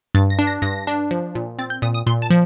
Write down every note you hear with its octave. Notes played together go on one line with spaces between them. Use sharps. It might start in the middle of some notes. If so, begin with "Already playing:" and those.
G2 A6
A#6
D4
A#6
G2 A#6
D4
F3
A#2
C4 A6
G6
A#2 D#6
D#6
A#2 C6
A5
F3